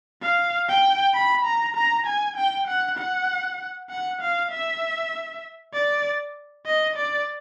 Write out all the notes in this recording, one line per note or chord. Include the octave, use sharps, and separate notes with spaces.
F5
G5
B5
A#5
A#5
G#5
G5
F#5
F#5
F#5
F5
E5
D5
D#5
D5